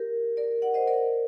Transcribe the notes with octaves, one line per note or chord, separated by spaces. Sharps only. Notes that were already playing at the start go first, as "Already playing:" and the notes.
Already playing: G4 A#4
A#4 D5
D5 F#5
C5 D#5
A#4 D5